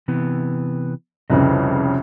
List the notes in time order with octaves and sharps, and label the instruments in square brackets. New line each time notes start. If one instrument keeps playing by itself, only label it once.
[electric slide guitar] C3 E3 B3
[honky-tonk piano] C2 F2 C#3 [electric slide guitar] B4 D#5